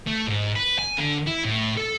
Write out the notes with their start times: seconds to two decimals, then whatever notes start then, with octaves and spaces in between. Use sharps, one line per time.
0.07 A3
0.27 G#2
0.56 B4
0.79 G#5
0.98 D3
1.27 E4
1.45 A2
1.77 A4